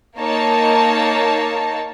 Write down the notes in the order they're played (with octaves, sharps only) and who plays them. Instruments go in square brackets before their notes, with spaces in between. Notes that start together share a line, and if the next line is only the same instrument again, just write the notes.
[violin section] A#3 D#4 A#4 C#5 A5